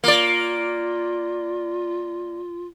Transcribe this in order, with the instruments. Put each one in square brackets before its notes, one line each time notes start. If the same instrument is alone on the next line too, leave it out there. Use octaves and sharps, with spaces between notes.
[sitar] A#3 D5 [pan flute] F4